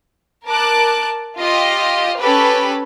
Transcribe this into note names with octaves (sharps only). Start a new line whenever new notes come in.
A#4 A5 D6 F#6
F4 G4 D#5 F5
C#4 G4 A4 B4 B5